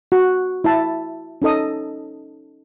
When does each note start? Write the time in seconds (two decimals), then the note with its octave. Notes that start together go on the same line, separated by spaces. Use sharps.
0.12 F#4
0.64 E4 E5 A5
1.42 C#4 D#4 A4 D#5 D#6